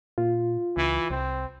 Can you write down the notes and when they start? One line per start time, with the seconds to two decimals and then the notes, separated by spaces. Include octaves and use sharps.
0.18 A#2 F4
0.77 C#2 E3
1.10 C2 C4